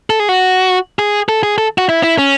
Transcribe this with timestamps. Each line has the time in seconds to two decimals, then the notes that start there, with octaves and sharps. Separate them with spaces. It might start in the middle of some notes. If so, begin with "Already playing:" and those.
0.10 A4
0.20 G#4
0.29 F#4
0.99 G#4
1.29 A4
1.43 G#4
1.58 A4
1.78 F#4
1.89 E4
2.03 E4
2.18 C#4